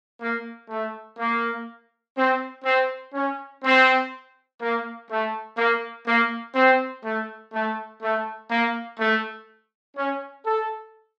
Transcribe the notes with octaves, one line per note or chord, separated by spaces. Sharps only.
A#3
A3
A#3
C4
C4
C#4
C4
A#3
A3
A#3
A#3
C4
A3
A3
A3
A#3
A3
C#4
A4